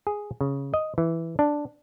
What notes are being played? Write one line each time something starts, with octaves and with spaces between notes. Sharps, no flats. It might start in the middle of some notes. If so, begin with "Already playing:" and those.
G#4
C#3
D#5
E3
D4